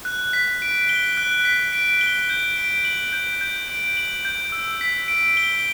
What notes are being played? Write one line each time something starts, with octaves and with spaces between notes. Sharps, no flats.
F#6
B6
D7
G7
F#6
B6
D7
G7
G6
D7
F#7
G6
G6
D7
F#7
G6
E6
B6
D7
G7